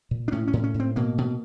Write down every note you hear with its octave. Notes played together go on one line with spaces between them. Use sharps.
A#2
D4
A2 C#4
C#4
A2
C#4
A2
C4
B2 A#3
B2